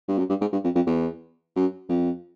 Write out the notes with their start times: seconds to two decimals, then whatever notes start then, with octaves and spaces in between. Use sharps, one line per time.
0.09 G2
0.18 F#2
0.29 G2
0.41 G#2
0.53 G2
0.64 F2
0.75 F2
0.86 E2
1.56 F#2
1.89 F2